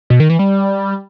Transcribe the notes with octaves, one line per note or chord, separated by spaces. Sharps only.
B2
D#3
E3
G3